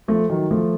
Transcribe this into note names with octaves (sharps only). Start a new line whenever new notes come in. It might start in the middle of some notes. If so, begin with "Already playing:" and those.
F3 A3
D#3 F#3
F3 A3